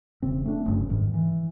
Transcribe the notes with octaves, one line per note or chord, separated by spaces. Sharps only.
E1 C#3 C4
A3 D4
F#1 G2 C#3
F2 G#2 D#3
E3